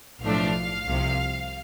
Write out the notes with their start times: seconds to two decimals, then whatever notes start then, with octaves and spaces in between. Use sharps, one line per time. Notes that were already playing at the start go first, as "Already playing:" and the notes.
0.22 B1 A2 F3 A3 D4 F5
0.87 C2 C3 F3